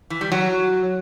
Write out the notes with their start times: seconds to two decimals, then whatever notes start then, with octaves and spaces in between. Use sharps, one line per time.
0.10 E3
0.21 G3
0.32 F#3